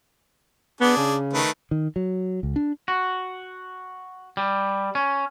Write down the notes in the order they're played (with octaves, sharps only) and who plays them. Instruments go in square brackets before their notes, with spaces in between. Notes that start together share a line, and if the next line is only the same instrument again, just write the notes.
[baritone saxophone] B3 [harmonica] D4 G#4
[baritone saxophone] C#3
[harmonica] D#3 A3 B4
[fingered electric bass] D#3
F#3
C#2
D4
[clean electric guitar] F#4
G3
C#4